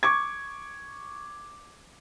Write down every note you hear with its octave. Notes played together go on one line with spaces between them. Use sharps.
C#6 D6 G#6